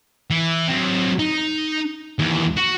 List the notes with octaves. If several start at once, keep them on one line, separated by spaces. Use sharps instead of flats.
E3
F#3 C4
D#4 A#5
D#2 E3
F#4